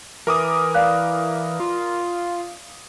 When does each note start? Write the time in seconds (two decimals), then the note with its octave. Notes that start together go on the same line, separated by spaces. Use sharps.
0.27 E3 A#4 D6 D#6
0.74 D5 F5 F#6
1.60 F4